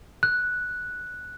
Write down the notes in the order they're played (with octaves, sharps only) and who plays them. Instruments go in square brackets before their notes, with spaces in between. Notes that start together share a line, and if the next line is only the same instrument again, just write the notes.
[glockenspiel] F#6